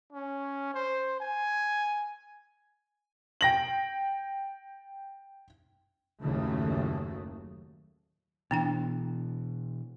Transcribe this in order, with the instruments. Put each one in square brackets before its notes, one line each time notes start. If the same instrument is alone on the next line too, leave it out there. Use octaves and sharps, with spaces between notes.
[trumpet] C#4
C5
G#5
[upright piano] G5 A#6 F#7
[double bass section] F#1 D#2 A2 C#3 F#3 A3
[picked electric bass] B2 E3 [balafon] B3 D4 G5